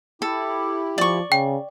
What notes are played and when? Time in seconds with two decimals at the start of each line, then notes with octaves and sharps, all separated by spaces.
0.22 E4 G4 A4
0.98 F3 D5 C#6
1.32 C#3 G5